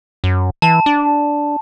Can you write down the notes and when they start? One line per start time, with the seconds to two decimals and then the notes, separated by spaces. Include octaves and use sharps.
0.24 F#2
0.62 E3 A5
0.86 D4